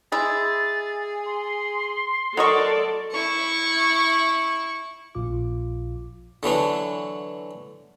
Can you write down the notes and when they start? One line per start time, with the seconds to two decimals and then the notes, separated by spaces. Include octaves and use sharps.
0.12 G#3 E4 G#4 A6
1.26 C6
2.37 F#3 A4 A#4 D5 D#5 C#6
3.12 E4 C#6
5.15 A#1 A#2 F4 D6
6.43 D3 E3 F#3 D4